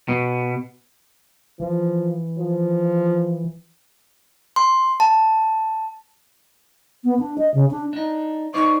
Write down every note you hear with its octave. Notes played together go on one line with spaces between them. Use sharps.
B2
E3 F3
F3
C6
A5
B3
D4
D#5
C#3
D4
D4 D#4
D#4 C5 D5 C#6